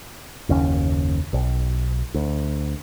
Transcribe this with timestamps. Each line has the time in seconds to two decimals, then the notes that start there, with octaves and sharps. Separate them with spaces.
0.49 F#1 D#2 C#4
1.33 B1
2.14 D2